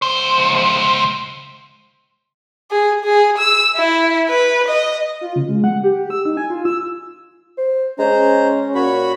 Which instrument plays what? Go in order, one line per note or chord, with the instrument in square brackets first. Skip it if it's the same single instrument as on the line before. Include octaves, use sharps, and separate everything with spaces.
[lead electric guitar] C#2 C5
[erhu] G#4
G#4
E6
E4
B4
D#5
[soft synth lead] F4
C#3
G#3
F#5
G4
E6
D#4
G#5
F4
E6
[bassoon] C5
[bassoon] G#3 [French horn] C#4 [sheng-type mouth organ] C5 A#5
[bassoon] A#2 [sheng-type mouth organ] F#4 C#5 B5